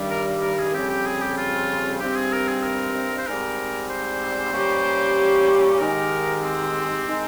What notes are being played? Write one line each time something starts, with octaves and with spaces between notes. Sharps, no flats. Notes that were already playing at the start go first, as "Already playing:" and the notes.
Already playing: G2 D#3 G3
A#4
A#4
G#4
F2 C#3 G3 C4 G4
G4
G#4
G4
F4
G2 G3 C4 D#4 G4
G#4
A#4
G#4
A#4
C5
G#2 G3 C4 A#4
C5
A#2 G3 C#4 G4
G#2 D#3 G#3 D#4 G4 A#4
C4
D#3 G#3 D#4